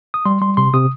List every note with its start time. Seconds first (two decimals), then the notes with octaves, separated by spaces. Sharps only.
0.14 D#6
0.25 G3 C6
0.41 G3 C6
0.57 C3 C6
0.73 C3 D#6